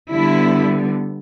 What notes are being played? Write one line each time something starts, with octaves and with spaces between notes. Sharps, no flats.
D3 G3 B3 E4